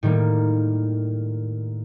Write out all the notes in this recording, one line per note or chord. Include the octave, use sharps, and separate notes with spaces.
A2 D#3 G3 A#3